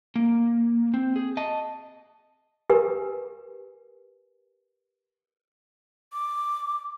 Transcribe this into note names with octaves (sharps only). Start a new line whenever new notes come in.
A#3
C4
G#4
D#5 A5
G4 A#4 B4 G#5
D6